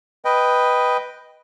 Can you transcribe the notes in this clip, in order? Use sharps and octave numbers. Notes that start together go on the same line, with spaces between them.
B4 D#5 G5